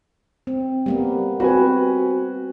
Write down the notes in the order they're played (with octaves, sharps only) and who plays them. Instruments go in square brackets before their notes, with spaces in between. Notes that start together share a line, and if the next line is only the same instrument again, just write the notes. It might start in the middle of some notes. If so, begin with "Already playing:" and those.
[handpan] C4
G3 A#3 B3
[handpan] C4 [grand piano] F#4 B4 G#5